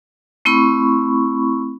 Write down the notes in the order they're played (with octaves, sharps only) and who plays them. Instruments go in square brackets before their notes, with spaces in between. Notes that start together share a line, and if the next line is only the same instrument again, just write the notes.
[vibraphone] A3 C4 E4 B5 C#6